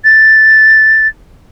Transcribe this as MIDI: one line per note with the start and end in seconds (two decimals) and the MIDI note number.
0.04 1.08 93